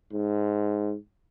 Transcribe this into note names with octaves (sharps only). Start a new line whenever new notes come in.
G#2